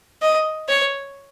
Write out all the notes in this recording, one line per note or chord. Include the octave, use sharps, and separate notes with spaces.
D#5
C#5